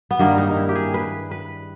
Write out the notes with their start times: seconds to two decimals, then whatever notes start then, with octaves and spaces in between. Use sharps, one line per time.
0.11 B3
0.19 G2 D#3 G3 A#3
0.38 D#4
0.51 D#4
0.56 E4
0.69 G4
0.75 G#4
0.94 B4
1.31 B4